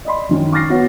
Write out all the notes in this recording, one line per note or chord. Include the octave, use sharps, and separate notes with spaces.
D5 D#5 B5 C6
F#2 D#3 C#4
C#6 D6 F6 A6 A#6 C7
B3 F#4 B4 C#5 F#5